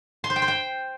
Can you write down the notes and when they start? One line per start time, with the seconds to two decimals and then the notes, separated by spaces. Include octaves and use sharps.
0.24 C6
0.30 C5
0.36 G5
0.42 C5
0.48 G5